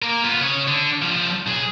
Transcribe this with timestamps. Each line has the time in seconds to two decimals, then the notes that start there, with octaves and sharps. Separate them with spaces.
0.02 A#3 A#4
0.23 B3 F4
0.41 C#3 C#5
0.68 D3
1.02 F3 G3
1.47 B1 G#4